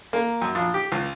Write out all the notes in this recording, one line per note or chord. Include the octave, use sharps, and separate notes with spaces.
A#3
F#2
A#1
G4
C#2